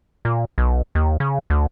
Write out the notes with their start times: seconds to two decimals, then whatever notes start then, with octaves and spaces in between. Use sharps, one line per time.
0.25 A#2
0.58 B1
0.95 D#2
1.20 C#3
1.50 D2